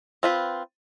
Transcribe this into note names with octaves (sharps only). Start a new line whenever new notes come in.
C4 F4 B4